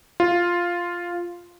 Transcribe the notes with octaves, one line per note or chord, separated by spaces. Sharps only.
F4